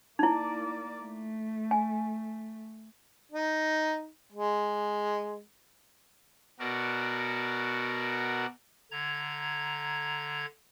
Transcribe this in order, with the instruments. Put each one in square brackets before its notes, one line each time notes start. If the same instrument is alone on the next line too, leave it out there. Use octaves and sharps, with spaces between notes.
[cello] A#3 D5 [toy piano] D#4 E4
[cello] A3
[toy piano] G#5
[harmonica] D#4
G#3
[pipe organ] B2 F#4 A#4 D5
D3 A#5 G#6